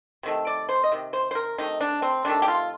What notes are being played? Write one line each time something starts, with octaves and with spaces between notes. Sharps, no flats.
C3 D#3 A3
D5
C5
D#5
C3 D#3
C5
C5
A#4
C3 D#3 A3 D#4
D4
C4
C3 D#3 A3 D4
G4
F4